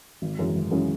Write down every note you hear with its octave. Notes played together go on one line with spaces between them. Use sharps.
G#1
F#2 C#3 E3 G#3
G#1
F#2 C#3 E3 G#3